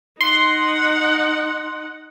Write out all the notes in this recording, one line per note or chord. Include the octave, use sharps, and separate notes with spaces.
D#4 F#5 C6